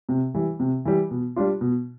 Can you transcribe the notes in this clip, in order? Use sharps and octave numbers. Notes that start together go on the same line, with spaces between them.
C3
E3 G3
C3
E3 G3
B2
G3 D4 F4
B2